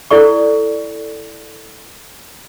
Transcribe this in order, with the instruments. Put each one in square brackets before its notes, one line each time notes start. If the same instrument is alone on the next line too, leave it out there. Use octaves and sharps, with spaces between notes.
[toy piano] E4 A4 D5 C#6